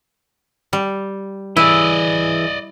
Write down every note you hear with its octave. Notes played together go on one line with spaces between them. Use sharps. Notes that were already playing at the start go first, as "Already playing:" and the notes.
G3
E3 E4 G#4 D5 D#5